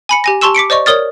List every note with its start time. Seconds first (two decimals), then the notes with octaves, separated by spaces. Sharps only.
0.09 G#5 B5 C#7
0.24 G4 G#5 A#6
0.41 G4 A5 C6 C#6 E6 E7
0.55 D6 B6 C#7 D7
0.70 C5 D5 D#5 C#6
0.86 A#4 C#5 D5 D#6 F6 A6